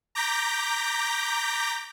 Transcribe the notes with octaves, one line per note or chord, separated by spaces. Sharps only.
A#5 D6 G6 A#6 B6